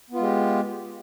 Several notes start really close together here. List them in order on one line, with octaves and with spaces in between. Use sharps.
B3 F4 G#3 G4